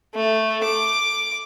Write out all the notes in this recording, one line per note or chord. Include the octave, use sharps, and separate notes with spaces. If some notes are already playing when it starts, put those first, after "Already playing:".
A3
D6